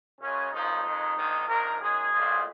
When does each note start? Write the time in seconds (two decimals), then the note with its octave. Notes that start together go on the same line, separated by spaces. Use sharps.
0.20 F#2 C#3 G#3 C#4
0.52 G#1 F#2 F3 G#3 D#4
0.84 F2 D#3 G#3
1.16 A#1 G#2 D#3 G#3
1.47 A#1 G#2 D#3 A#4
1.79 F#2 D#3 G#3 G#4
2.11 B1 A#2 F3 G#3